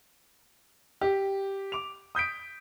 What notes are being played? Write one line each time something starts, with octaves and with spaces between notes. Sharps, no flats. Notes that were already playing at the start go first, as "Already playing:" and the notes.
G4
D6 F7
D#6 G6 B6 D7